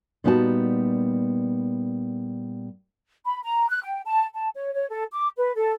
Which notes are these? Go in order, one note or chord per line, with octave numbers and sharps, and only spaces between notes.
A#2 G3 B3 D#4 F#4 A5
B5
A#5
F#6
G5
A5
A5
C#5
C#5
A4
D6
B4
A4